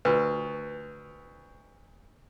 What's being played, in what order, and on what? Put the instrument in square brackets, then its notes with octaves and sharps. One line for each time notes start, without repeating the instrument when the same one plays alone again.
[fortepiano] D2 [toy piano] F4 B4